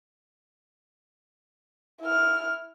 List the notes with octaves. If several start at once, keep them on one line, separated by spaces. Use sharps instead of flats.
E4 F6